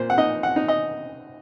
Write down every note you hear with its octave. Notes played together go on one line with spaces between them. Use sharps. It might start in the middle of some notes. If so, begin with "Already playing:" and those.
Already playing: A#2 C5
F#5
D#4 D#5
F#5
D#4
D#5